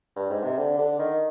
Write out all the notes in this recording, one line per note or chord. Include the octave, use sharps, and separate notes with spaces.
G2
G#2
C3
D3
D3
D#3